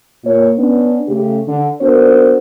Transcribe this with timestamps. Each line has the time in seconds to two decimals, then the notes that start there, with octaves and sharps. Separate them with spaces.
0.25 A#2 A#3 C#5
0.58 B3 C#4 D4
1.08 C#3 A3 G4
1.48 D3
1.81 B3 D4 F#4 A#4 C5